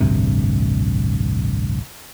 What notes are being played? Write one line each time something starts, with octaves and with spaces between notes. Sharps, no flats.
A1 D2 G2 C3